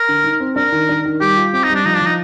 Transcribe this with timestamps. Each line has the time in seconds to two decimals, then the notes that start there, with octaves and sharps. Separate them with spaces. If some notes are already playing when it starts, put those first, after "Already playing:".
Already playing: A#4
0.08 D3
0.24 D#4
0.40 C4
0.56 D4 A#4
0.72 D#3
0.89 D4
1.05 D#3
1.21 G3 G4
1.36 F4
1.53 C4 G4
1.64 D#4
1.70 G3
1.75 D4
1.86 F3 D#4
1.96 D4
2.01 F3 D#4